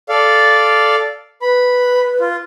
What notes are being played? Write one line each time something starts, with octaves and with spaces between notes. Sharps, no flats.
A4 D5 F5
B4 B5
F4